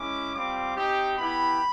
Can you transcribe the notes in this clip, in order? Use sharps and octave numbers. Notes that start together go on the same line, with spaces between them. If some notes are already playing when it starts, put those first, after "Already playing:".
Already playing: G#3 C#4 E4 D6
G3 C4 F4 D6
C4 D#4 G4
B3 E4 G4 B5